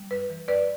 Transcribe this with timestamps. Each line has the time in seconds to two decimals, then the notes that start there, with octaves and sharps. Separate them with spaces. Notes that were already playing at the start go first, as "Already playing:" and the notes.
Already playing: G3
0.11 F#2 B4
0.29 E3
0.48 F#2 B4 D5